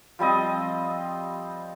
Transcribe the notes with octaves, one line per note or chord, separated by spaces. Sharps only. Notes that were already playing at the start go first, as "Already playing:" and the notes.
F3 G3 C4 D#5